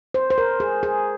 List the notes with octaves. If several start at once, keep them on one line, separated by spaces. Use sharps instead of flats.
C5
C5
A#4
G#4
G#4